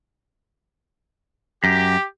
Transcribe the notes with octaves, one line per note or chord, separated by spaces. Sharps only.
F#2 G4